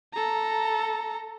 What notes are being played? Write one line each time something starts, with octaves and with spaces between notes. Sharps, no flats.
A4 A#5